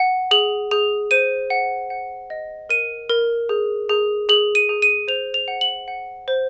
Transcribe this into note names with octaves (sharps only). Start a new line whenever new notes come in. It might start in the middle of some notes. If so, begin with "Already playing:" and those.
Already playing: F#5
G#4 F#7
G#4 F7
C5 D#7
F#5
F#5
D#5
A#4 D#7
A#4
G#4
G#4
G#4 F#7
D#7
G#4
D#7
C5 F7
F7
F#5
F#7
F#5
C5